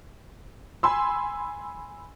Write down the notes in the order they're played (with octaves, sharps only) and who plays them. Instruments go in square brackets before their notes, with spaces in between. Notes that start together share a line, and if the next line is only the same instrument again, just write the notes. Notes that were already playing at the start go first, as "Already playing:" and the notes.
[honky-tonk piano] G#5 B5 C6 E6